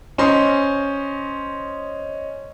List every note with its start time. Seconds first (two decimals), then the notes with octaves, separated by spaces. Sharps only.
0.18 C#4 C5 D#5 C6